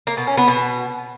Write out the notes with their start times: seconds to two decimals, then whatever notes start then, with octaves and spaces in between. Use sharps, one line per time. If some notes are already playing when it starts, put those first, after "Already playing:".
0.07 A#3
0.17 B2
0.27 C#4
0.38 B3
0.48 B2